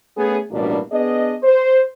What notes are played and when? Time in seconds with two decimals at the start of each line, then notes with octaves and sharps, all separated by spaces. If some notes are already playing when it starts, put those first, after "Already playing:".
0.17 A3 B3 C#4 G#4
0.51 A1 F#2 B2 G3 A#3 D4
0.92 B3 D4 G#4 D#5
1.43 C5